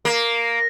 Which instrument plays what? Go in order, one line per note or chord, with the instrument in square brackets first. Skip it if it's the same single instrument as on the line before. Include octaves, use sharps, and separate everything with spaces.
[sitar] A#3